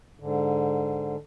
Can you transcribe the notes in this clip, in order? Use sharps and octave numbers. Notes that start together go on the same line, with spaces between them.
G#2 D3